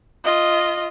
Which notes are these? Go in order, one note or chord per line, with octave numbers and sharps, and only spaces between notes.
F4 D#5